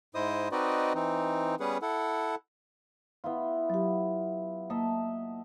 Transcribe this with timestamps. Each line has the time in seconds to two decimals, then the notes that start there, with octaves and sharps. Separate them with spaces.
0.15 G#2 E4 C5 D#5 D#6
0.52 C4 D#4 F#4 B4 D5 D#5
0.95 E3 C4 D#4
1.60 G3 B3 C#4 G#4 B4 F#5
1.82 E4 A4 F#5
3.24 B3 E4 F4
3.70 F#3 G4
4.70 A#3 D#5 E5 A5